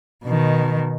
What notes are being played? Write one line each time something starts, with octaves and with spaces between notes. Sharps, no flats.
B2 D#3